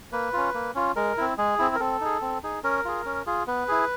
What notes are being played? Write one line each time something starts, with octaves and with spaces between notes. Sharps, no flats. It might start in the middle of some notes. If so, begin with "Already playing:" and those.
A#3 B4
C#4 F4
A#3
C#4 F4
G#3 A#4
C4 E4
G#3 G#4
C4 E4
A#4
C4 A4
D#4 G#4
C4
D#4 G#4
C#4 A#4
F4 G#4
C#4
F4 G#4
B3 B4
E4 G#4